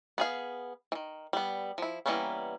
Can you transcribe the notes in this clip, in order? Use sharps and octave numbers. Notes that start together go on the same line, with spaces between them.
B3 G#4 F5
D#3 E3
G3 B3
F3 E4
E3 G3 A#3 B3 C#4